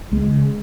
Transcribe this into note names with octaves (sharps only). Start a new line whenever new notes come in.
C#2 G#3
C#3